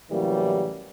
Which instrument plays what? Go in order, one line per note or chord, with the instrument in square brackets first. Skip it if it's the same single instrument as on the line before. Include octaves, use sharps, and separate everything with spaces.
[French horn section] A2 C#3 E3 F#3 G3 A#3